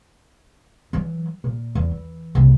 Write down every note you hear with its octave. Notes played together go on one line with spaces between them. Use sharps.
E3 F#3
A#2
E2
E3
F#1 C2